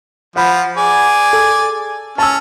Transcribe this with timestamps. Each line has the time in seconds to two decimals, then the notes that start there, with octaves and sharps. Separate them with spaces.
0.36 F3 F#5 B5
0.77 G#4 D5 G#5
1.33 A4
2.18 C#4 A5 E6